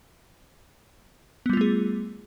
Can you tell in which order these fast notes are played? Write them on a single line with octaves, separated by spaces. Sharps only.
B3 G3 F4 A3 G#4